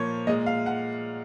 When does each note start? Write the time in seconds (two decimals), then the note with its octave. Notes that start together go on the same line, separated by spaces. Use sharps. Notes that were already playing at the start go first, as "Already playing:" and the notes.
Already playing: A#2 F3 A#3 C5 C#5
0.27 A#2 G#3 D#5
0.46 F5
0.66 F#5